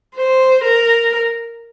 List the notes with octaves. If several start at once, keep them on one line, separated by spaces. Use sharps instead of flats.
C5
A#4